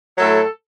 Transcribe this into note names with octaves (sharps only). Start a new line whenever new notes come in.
A2 F#3 A3 A4